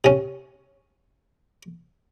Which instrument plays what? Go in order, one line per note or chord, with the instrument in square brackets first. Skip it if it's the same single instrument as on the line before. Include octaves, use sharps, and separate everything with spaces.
[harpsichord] C3 C#4